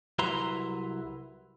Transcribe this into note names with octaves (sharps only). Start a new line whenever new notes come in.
C2 F#3 E4 B4 A#5 C6